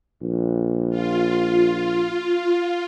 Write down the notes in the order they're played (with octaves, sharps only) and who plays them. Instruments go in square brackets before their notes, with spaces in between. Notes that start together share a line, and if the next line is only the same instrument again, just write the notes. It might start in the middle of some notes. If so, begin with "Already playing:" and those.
[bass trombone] A#1
[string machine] F4